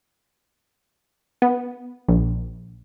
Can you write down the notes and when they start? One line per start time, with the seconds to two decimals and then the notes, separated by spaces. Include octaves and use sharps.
1.42 B3
2.08 A#1